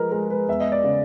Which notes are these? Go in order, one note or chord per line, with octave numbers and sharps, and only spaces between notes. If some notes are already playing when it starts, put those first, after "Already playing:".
Already playing: F3 G#3 A#4 B4 D#5
G#3 A#4
B4
E2 E5
D#5
D5
C#3